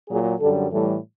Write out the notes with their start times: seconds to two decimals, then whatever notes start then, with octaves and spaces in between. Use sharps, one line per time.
0.09 A#2 F#3 G#4
0.40 F#2 D3 G3 A4
0.71 A2 E3 G3 A4